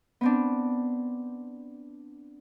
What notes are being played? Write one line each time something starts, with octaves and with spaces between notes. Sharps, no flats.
B3 C4 D4